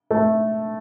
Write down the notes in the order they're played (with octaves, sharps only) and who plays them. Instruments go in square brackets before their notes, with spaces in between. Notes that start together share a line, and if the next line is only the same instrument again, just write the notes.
[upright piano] A3